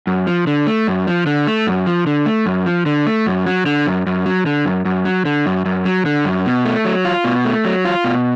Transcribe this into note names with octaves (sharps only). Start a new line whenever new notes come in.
F#2
F3
D3
A3
F#2
F3
D3
A3
F#2
F3
D3
A3
F#2
F3
D3
A3
F#2
F#3
D3
F#2
F#2
F#3
D3
F#2
F#2
F#3
D3
F#2
F#2
F#3
D3
F#2
B2
A3
F#3
F4
B2
A3
F#3
F4
B2